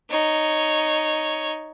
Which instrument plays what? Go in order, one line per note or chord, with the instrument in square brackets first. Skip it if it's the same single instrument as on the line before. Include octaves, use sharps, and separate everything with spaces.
[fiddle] D#4 C#5